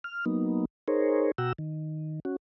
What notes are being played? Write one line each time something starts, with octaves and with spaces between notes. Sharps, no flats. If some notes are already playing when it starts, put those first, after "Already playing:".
F6
F#3 A#3 B3 D#4
D#4 G#4 A#4 C5 C#5
B2 F#4 F#5 G5 A#5 E6
D#3
C#4 F#4